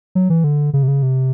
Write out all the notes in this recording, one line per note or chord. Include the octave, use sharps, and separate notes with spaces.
F#3
E3
D3
C#3
C3
C#3
C3